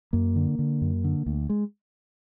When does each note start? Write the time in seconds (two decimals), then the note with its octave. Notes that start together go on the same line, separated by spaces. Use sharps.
0.13 F#2 A#3
0.36 D3
0.59 D3
0.82 F#2
1.04 D3
1.26 D2
1.49 G#3